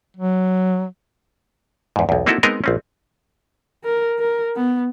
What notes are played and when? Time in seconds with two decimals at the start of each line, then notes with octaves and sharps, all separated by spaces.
0.17 F#3
1.96 E2 G#2
2.09 B1 E2
2.26 A#3 C4 D#4 E4 F#4 A4
2.43 G#3 B3 C4 D#4 A#4 D#5
2.64 A#1 C4 C#4
3.85 A#4
4.19 A#4
4.56 B3